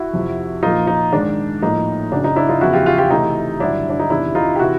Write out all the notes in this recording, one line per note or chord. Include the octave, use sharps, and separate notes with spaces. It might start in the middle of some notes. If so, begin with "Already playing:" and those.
Already playing: E4 F#4
F2 C3 F3
A#2 F3 A#3 D#4 F4
D#4
G#2 D#3 G#3 D4
A2 F3 A#3 D#4
F#2 C#3 F#3 D4
D#4
D4 E4
D#4 F4
E2 C#3 F3 E4 F#4
F4 G4
F4 G4
F4 G4
C3 E3 A3 D#4
G2 D3 F#3 D4 E4
D4
D#4
E2 C3 D#3 D4 E4
D#4 F4
G4
C3 E3 E4 F#4